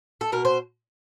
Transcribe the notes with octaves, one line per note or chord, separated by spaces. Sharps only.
A4
B2 A#4
C5